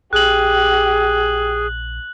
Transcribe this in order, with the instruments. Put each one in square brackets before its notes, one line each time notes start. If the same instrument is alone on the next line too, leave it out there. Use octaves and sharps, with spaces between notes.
[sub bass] A#1 [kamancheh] G4 [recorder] G#4 [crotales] F#6 F#7